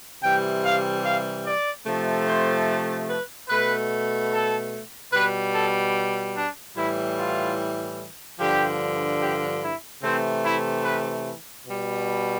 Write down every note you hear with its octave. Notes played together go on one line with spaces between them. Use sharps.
C3 E3 G3 G5
F5
F5
D5
C3 F3 A3
C5
B4
B2 A3 B4
A4
B2 G3 B4
A4
D4
A2 E3 G3 E4
F4
G2 D3 F3 G4
G4
E4
C3 E3 A3 C4
E4
B4
B2 G3